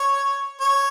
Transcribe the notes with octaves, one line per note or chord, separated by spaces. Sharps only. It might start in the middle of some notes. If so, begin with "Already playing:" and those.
Already playing: C#5
C#5